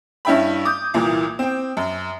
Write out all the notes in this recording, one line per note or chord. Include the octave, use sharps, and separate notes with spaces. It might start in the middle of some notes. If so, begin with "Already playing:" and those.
G2 C#4 E4 E5 G5 B5
D6 D#6 G6
C2 A#2 E3 A#3
C4 G5
F#2